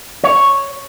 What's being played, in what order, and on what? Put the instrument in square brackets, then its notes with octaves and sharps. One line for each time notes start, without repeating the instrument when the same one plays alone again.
[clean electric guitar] C#5